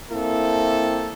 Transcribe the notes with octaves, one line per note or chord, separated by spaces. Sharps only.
A#3 C4 E4 A4